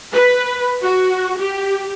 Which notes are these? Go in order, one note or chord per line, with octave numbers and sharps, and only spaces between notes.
B4
F#4
G4